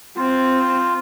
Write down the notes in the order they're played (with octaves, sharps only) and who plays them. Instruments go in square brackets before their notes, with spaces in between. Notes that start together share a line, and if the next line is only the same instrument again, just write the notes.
[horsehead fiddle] C4 [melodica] F4